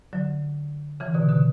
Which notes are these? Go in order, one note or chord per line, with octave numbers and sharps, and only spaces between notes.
D3 F#3
C#3 E3
B2 D3
B2 D3